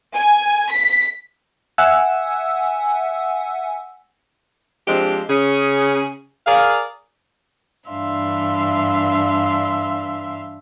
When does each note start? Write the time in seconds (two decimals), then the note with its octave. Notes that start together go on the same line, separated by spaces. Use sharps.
0.15 G#5
0.71 B6
1.78 E5 F#5 G#5 E6
4.88 F3 G#3 C4 D4 G4
5.29 C#3 C#4 G#4
6.47 G#4 A#4 D5 F5
7.89 G2 E3 D4 E5 F5 C6